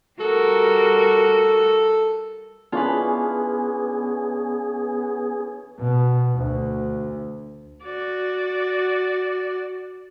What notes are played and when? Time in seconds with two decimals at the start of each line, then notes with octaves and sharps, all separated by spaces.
0.20 G3 F#4 A4 A#4
2.72 E3 B3 C#4 D4 F4 G#4 B4
5.79 B2
6.37 D2
7.84 F#4 D5